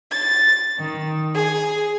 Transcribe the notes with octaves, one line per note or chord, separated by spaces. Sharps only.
A6
D#3
G#4